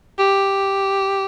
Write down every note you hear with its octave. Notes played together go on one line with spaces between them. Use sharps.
G4